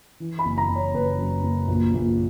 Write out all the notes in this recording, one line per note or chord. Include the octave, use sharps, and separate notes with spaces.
E3
B5
F#1
A#5
F#1
C#5
F#1 B4
F#2
F#1
A#1
A#1